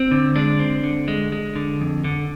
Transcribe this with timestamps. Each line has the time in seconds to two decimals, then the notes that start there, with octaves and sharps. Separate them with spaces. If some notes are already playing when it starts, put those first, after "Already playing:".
Already playing: C4
0.11 D3
0.36 G#3 D4
0.59 C4
0.84 D3
1.08 G#3
1.32 G#3
1.55 D3
1.81 F2
2.04 D3